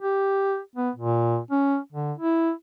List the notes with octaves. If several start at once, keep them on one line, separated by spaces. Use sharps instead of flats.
G4
B3
A#2
C#4
D3
E4